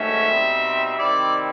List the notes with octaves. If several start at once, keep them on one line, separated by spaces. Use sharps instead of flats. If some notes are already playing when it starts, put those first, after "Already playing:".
Already playing: G#2 D#3 F#3 A3 C#4 E5
B2 G3 C4 D#4
C3 D#3 G3 C4 E4 D5